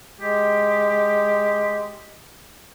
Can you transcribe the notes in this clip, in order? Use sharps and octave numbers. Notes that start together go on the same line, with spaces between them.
G#3 G4